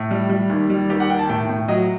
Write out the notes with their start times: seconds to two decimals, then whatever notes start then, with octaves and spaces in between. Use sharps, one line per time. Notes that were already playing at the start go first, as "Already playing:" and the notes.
Already playing: A2
0.11 G3
0.29 G3
0.49 D#2
0.70 G3
0.89 D#2 G4
1.00 F#5
1.09 D#3 G5
1.19 A5
1.29 A2 G5
1.49 A2
1.68 F#3 D#5